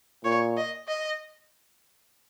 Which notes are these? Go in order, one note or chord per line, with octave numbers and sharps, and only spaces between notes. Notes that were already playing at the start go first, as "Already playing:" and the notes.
A#2 C#5
D#5
D#5